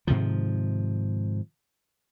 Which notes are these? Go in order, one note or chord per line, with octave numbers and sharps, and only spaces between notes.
G#2 C3 D#3 F3